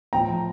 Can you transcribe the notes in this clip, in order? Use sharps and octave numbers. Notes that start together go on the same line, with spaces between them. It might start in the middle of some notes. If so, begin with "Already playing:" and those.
A2 F3 G5 A#5